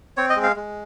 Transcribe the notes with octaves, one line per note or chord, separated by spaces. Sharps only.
C4 C#5
D#5
G#3
F5
G#3